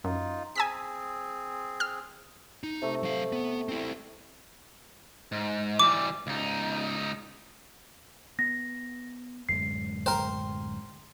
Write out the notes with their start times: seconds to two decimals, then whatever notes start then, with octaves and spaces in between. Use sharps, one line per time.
0.04 F#2 D#4 F4
0.56 C4 G#4 G#5 E6 B6
1.80 F6
2.63 D#4
2.82 C3 A3
3.03 F#3 F5
3.32 B3
3.69 C4 E4
5.32 G#2
5.79 E3 G3 D6
6.27 C#2 D#4
8.39 B3 A#6
9.49 D1 F#2 G#3 C7
10.06 A#4 C5 G5 A#5